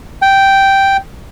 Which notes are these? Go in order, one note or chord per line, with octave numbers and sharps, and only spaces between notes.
G5